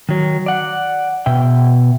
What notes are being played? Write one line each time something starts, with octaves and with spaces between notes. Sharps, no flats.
D#3 F#3
D5 F#5
B2 E5 G5